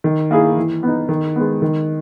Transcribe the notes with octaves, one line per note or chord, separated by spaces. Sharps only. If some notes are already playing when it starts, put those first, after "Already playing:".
D#3
A#3 E4 G#4
E3
B3 D#4
D#3
G#3 B3
D#3